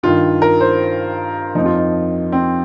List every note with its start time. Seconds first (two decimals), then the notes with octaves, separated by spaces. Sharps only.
0.03 G2 D#3 F4
0.42 A#4
0.60 C5
1.55 F3 D#4
1.60 F2 F4
1.75 D#4
2.32 C4